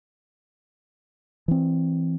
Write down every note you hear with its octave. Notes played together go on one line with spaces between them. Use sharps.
E3 C4